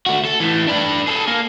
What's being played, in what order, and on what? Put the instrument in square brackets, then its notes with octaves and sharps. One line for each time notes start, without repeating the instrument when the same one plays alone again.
[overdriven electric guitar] A3 F#4
A4
E3 A3
D4 B4
G#4 A4
A#3